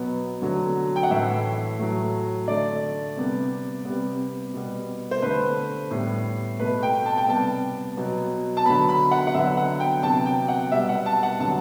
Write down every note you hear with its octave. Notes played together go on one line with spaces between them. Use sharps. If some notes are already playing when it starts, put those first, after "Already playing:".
Already playing: B2 F#3 B3
D3 F#3 A3
G5
F#5
A2 E3 A3 E5
A2 F#3 A3
D3 A3 D5
C3 G3 B3
C3 G3 B3
B2 G3 B3
C5
D3 A3 B4
A2 G3 B3
B2 A3 B4
G5
A5
G5
C3 G3 B3 A5
B2 F#3 B3
A5
D3 F#3 B3 B5
B5
F#5
F#5
D3 F#3 B3 E5
F#5
G5
C3 F#3 B3 A5
G5
F#5
B2 G3 B3 E5
F#5
A5
F#5
D3 F#3 B3 A5